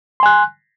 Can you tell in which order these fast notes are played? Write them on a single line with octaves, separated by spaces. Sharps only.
C6 G#5 F#6